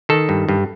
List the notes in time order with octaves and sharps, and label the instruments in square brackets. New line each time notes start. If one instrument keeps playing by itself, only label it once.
[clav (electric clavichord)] D#3 A4
G2
G2